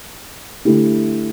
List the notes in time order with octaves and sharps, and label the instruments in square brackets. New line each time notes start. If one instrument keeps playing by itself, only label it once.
[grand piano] D3 A3 E4 G4